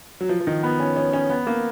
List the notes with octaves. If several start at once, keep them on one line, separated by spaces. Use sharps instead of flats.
F#3
F3
F3
D#3
B3
C#4
C#4
C#4
B3
A#3